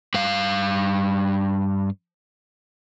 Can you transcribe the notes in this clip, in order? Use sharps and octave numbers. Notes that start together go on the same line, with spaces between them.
G2 F5